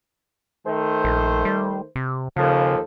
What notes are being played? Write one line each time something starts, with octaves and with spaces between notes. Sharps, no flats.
D#3 A3 C5
A#1
G3
C3
D#2 C#3 F3 A4